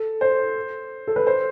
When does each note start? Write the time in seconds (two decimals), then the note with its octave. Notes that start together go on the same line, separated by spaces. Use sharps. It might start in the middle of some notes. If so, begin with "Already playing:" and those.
Already playing: A4
0.21 C5
1.08 A4
1.16 B4
1.27 C5